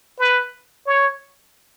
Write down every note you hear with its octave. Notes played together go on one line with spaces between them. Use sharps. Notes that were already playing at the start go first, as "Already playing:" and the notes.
B4
C#5